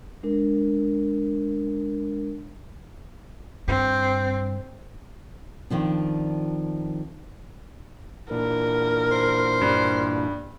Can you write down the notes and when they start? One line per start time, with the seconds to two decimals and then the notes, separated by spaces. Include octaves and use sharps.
0.23 G#3 D4 A#4
3.68 G2 C4
5.70 F2 D#3 F3 D4
8.31 A#2 E3 D4 A#4
9.11 C5
9.61 G2